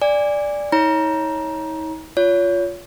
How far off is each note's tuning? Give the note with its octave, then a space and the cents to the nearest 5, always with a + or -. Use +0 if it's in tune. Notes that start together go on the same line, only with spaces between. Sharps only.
D5 +0 G#5 -30
D#4 +40 C#5 +0 A#5 +25
F4 +0 C#5 +30